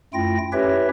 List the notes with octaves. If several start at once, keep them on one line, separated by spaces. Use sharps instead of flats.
F#2 A3 E4 F4 G5 A#6
C#4 E4 G4 B4 C#5 E5